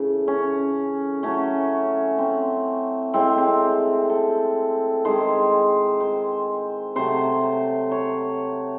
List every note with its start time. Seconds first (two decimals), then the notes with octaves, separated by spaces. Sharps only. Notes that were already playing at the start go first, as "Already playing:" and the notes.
Already playing: C#3 E3 A3
0.28 C#4
1.23 A2 F#3 A3 C#4
2.18 C4
3.14 A2 G#3 C4
3.38 C4
4.09 A4
5.05 D#3 G#3 C5
6.00 C5
6.96 C3 F#3 A3 C5
7.91 C#5